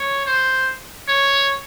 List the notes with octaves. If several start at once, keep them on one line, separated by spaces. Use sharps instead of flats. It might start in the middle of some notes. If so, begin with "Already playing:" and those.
Already playing: C#5
C5
C#5